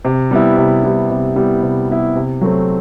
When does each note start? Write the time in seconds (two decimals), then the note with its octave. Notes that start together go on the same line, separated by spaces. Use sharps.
0.05 C3
0.31 G3 B3 E4
0.58 C3
0.83 G3 B3 E4
1.10 C3
1.36 G3 B3 E4
1.62 C3
1.89 G3 B3 E4
2.15 C3
2.41 F#3 A3 C4